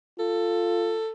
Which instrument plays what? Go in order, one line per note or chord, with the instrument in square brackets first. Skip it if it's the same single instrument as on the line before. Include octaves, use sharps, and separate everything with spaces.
[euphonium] F4 [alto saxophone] A4